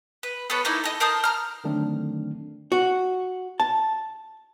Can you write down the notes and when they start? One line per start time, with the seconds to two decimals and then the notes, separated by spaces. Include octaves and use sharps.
0.23 B4
0.50 B3 A4 B4 C#5
0.65 A#3 D#4 E4
0.84 A4 D#5
1.00 A#4 C5 A5 D#6
1.24 A#5 F6
1.64 D3 D#3 F#3 A3 C4 D4
2.72 F#4
3.60 A5